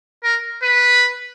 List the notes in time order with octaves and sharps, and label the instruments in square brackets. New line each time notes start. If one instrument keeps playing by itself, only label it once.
[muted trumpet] A#4
B4